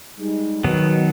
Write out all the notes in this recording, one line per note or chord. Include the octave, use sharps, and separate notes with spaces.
G3 G#3 D#4
B2 D#3 F#3 B3